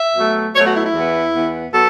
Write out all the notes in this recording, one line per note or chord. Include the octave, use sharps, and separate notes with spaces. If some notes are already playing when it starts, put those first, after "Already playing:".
Already playing: E5
B2 F#3 A3
B2 F#3 A3 C#5
F#4
E4
E4
E2 E3 B3
E2 E3 B3
B2 F#3 B3 A4